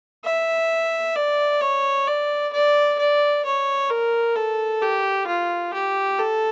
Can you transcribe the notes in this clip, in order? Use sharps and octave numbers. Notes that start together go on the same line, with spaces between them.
E5
D5
C#5
D5
D5
D5
C#5
A#4
A4
G4
F4
G4
A4